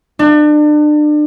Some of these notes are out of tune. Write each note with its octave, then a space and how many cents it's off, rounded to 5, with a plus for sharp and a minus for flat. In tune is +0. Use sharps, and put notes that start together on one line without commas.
D4 +35